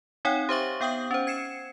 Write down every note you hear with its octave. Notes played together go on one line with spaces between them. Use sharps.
C4 D#4 C#5 F#5 G5
G4 C5 E5 C#6
B3 F5 G5 D#6 G6 F#7
C#4 C5
G#6 C7 C#7 E7